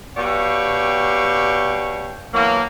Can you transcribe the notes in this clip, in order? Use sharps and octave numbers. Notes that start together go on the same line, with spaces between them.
B2 G4 C#5 D5 F5 G5
B2 E3 F#3 A#3